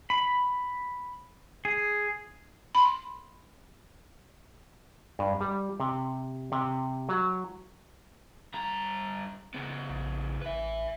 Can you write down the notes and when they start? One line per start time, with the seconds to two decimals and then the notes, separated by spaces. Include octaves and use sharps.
0.10 B5
1.65 G#4
2.75 B5 C6
5.19 G2
5.41 G3
5.80 C3
6.52 C3
7.09 F#3
8.54 G2 A#5
9.54 C#3 B3
9.90 A#1
10.42 A1 B4 E5